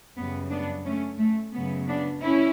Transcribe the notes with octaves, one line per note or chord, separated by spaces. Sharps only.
F#2 C#3 G3 B3
B3 D4
A3 C#4
A3
F#2 C#3 F#3 B3
B3 D4
C#4 E4